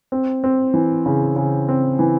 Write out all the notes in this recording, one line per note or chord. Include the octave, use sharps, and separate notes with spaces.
C4
C4
E3
C#3
C#3
C4
E3